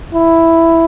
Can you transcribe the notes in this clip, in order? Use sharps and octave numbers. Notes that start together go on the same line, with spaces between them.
E4